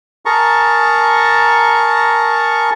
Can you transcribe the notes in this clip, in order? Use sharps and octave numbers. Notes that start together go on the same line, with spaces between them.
G#4 A#4 A5 A#5 C#6